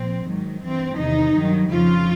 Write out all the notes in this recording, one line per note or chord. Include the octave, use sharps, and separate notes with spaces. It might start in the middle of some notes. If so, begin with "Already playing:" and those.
Already playing: A#2 F3 C4
G#2 D#3 F#3
G2 E3 C4
E2 C3 D#3 D#4
G2 D#3 F#3
F2 C#3 F3 F4